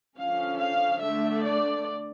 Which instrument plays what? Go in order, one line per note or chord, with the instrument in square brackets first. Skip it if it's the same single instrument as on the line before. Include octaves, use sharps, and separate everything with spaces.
[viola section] D3 F3 C#4 F5
F5
D3 A3 D4 E5
D5